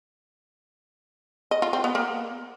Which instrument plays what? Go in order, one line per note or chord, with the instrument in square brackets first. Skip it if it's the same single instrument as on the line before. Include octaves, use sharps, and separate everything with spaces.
[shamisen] D#5
F4
C4
B3
A#3